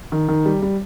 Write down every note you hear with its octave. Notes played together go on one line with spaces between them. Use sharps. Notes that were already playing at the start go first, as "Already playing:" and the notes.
D#3
D#3
G3
G3